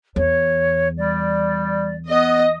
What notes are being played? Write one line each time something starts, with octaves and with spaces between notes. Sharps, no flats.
E2 C#5
G3 D5
B3 D#5